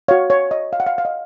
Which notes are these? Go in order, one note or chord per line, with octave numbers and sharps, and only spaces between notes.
F#4 C#5 F5
C#5
D#5
F5
F#5
F5
F5
D#5